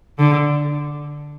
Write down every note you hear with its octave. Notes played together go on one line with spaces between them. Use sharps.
D3